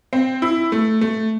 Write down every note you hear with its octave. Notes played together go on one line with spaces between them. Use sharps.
C4
E4
A3
A3